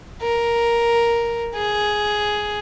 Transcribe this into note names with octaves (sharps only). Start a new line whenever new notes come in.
A#4
G#4